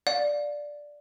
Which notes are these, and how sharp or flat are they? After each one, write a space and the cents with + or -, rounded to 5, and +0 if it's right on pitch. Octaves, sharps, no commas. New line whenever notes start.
D5 +0 F5 +35